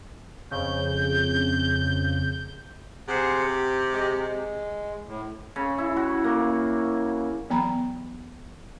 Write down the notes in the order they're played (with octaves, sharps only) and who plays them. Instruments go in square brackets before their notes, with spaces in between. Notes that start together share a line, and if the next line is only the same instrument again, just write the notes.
[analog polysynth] F2 C#3 [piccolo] G6
[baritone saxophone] C3 [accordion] G#4 C5 F#5
[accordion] G4
G#3 G4 D#5
G#3
A2
[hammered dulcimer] C#3
E4
F#4
A#3
[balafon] E3 F#3 B3 G5 A#5 B5